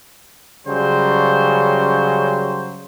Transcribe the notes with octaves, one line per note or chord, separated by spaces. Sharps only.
C#3 F#3 G3 C5